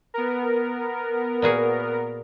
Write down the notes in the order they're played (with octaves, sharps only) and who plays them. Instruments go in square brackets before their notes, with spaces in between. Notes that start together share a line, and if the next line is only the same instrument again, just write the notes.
[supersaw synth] B3 A#4
[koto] A#2 F#4 G#4